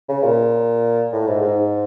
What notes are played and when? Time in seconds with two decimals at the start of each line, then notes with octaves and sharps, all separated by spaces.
0.09 C#3
0.24 A#2
1.12 A2
1.27 G#2
1.42 G#2